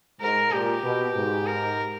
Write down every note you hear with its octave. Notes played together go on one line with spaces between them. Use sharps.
G#2 A#4
A#2 G4
B2
G#2
A#4